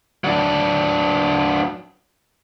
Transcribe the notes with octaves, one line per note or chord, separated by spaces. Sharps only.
F#3 D4